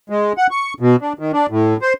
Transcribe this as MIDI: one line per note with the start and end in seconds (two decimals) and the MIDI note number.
0.10 0.33 56
0.38 0.47 78
0.51 0.74 85
0.80 0.96 47
1.02 1.13 62
1.19 1.32 51
1.33 1.47 62
1.50 1.77 45
1.82 1.93 72